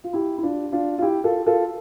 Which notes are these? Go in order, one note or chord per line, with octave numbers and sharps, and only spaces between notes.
F4
E4 G4
E4
D4 F4
D4 F4
F4
E4 G4
F4 A4
F4 A4